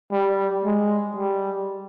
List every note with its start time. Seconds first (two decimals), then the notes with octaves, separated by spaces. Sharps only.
0.12 G3
0.65 G#3
1.17 G3